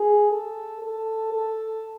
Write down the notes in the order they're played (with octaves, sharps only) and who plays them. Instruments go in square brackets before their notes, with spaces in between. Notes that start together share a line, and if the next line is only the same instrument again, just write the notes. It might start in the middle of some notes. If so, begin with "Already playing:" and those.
Already playing: [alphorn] G#4
A4
A4
A4